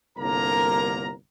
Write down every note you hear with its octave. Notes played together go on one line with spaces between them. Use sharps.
G1 C2 D3 A#3 A#4 A#5